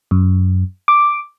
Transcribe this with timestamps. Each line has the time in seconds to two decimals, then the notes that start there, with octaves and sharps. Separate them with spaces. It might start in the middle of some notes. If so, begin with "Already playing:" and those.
0.11 F#2
0.88 D6